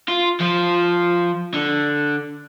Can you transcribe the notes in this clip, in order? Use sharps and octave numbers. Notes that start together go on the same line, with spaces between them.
F4
F3 F4
D3